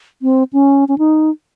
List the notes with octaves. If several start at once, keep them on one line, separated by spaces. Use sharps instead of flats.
C4
C#4
C#4
D#4